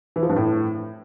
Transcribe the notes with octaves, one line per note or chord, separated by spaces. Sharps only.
E3
F3
G2
A2